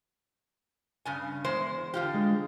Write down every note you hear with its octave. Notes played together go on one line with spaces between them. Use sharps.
G2 C#3 G#5
E2 G#3 C5
D3 F4 G4
G#3